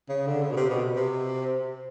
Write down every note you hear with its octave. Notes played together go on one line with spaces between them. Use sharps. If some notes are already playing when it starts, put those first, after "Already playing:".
C#3
D3
C#3
B2
C3
B2
C3